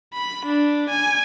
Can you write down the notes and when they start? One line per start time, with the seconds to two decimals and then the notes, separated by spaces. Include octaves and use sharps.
0.13 B5
0.46 D4
0.90 G#5